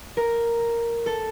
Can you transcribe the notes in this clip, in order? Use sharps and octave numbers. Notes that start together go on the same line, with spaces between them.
A#4
A4